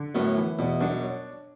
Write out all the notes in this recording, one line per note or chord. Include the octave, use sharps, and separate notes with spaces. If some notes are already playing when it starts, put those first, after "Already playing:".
Already playing: D3
F#2 A2 B3
E3
E2 B2
F#2 D4
C#5